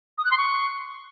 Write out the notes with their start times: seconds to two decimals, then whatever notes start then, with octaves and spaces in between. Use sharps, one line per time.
0.18 D#6
0.25 F#6
0.31 C6
0.38 C#6